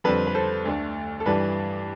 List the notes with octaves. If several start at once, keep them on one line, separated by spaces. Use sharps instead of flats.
F2 D3 G3 C4 B4
B4
A4 C5
D2 D3 A3
A4
G2 E3 G3 D4 B4